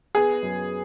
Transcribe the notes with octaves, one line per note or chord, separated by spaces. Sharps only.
B3 G#4
F#2